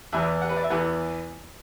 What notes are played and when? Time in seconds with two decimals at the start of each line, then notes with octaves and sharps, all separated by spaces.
0.12 E2 E3 B3 E5
0.42 F#5
0.49 B4
0.57 D5
0.64 E5
0.70 E2 E3 B3 F#5